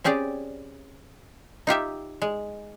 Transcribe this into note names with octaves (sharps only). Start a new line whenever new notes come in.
C4 C#4 G4 G#4 D5
D#4 F4 G4 E5
G#3